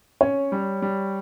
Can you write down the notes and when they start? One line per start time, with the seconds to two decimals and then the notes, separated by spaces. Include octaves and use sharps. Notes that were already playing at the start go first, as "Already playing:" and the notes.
0.21 C#4 C#5
0.52 G3
0.82 G3